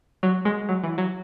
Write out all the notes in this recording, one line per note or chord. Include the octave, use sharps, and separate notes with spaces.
F#3
G#3
F#3
E3
F#3